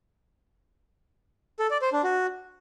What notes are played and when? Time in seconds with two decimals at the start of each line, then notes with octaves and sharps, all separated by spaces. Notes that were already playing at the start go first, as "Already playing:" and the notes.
1.60 A4
1.71 D5
1.82 C5
1.93 D4
2.04 F#4